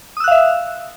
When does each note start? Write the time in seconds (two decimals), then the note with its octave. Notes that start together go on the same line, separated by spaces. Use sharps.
0.17 D#6
0.20 E6
0.24 F#6
0.28 F5
0.31 E5